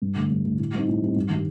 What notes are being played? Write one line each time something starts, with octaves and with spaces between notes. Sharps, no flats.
G2
D3 A3
G2
D3 A3
A2
G3 C4 D#4
A2
G3 C4 D#4
G2
D#3 G3